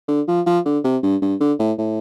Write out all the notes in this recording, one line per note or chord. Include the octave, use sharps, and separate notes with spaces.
D3
F3
F3
D3
C3
G2
G2
D3
A2
A2